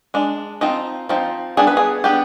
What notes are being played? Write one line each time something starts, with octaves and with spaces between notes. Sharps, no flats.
G#3 D4
F3 C4 D#4
F3 C4 D#4
G3 B3 D4 G#4
B4
G#4
G3 B3 D4 G4